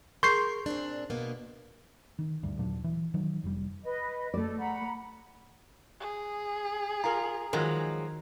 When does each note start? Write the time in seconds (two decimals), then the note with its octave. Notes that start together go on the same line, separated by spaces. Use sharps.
0.23 G#4 A#4 C6 C#6 G6 C7
0.66 A#2 C4 D4
1.10 B2 A#3 B3
2.19 D#3
2.43 D2 G2
2.59 D#2 A#2 F#3 D4
2.84 E3
3.14 D#3 F#3
3.44 F1 G3
3.83 B4 D#5
4.34 A3 A4 D5
4.59 F#5 A#5 B5
6.00 G#4
7.04 F4 A#4 A#5
7.53 D#3 F3 F#3 G#3